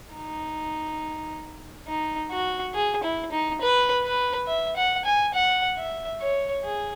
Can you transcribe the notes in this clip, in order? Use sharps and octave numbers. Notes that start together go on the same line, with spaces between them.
D#4
D#4
F#4
G#4
E4
D#4
B4
B4
E5
F#5
G#5
F#5
E5
C#5
G#4